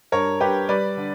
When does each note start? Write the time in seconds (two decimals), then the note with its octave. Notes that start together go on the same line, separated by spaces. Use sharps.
0.12 G2 A#4 C#5
0.40 G2 G4 B4
0.69 G3 B4 D5
0.97 D3